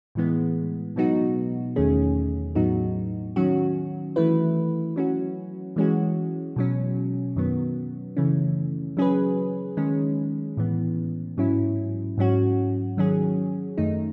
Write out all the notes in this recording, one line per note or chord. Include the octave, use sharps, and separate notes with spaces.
A2 E3 G#3 B3
B2 F#3 B3 D#4 F#4
E2 D#3 A3 C#4 G#4
A2 F#3 B3 D#4 F#4
D#3 F#3 C#4 F#4
E3 A3 E4 B4
F#3 C#4 F#4
E3 G#3 C#4 F#4
B2 F#3 C#4
F#2 D#3 F#3 B3
C#3 E3 A3 C#4
F#3 C#4 G#4 B4
D#3 G#3 C#4
A2 E3 B3
G#2 F#3 C#4 E4
G#2 F#3 C#4 F#4
D#3 F#3 C#4 G#4
F#2 D#3 A3 D#4